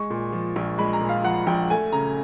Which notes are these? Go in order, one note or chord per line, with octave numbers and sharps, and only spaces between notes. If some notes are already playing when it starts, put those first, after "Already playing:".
Already playing: G#3 C#6
A#2
F3
A#1
G#3 B5
A#5
A#2
F5
F3 F#5
A#1 G5
A3 G#5
C#3 A#5